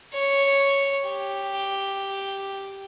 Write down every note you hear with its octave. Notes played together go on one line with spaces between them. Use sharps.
C#5
G4